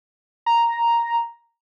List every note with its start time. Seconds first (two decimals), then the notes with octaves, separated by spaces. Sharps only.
0.46 A#5